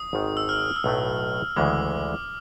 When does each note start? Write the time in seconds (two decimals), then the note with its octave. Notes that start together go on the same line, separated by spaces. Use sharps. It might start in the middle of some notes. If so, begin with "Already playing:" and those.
Already playing: D#6
0.13 G#1 G#2 D#3
0.37 E6
0.49 F6
0.76 E6
0.84 B1 A2 F#3 A3 D#6
1.56 D2 C#3 E3 G#3 D6